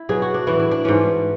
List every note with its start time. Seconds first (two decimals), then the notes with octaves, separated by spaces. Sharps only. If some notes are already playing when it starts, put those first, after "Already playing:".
Already playing: E4
0.09 B2 F#3 G#4
0.22 F#4
0.34 D4
0.47 A2 E3 E4
0.59 D4
0.71 D4
0.85 G#2 E3 C#4